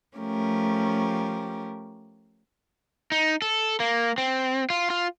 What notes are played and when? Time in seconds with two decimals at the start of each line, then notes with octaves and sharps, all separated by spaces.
0.17 F3 A3 C#4 G4 A#4
3.12 D#4
3.42 A4
3.80 A#3
4.18 C4
4.70 F4
4.90 F4